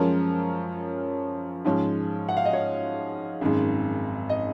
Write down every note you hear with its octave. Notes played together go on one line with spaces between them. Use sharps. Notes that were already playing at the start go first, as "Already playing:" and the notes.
Already playing: F#2 F3 G#3 C#4 A#4
G#2 F3 G#3 C#4
F#5
F5
D#5
C#5
G#1 F#2 D#3 G#3
D#5